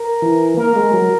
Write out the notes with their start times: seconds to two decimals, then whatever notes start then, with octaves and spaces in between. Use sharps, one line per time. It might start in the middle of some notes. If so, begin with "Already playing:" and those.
Already playing: A#4
0.22 E3
0.57 A#3 A#4
0.76 G#3
0.93 F#3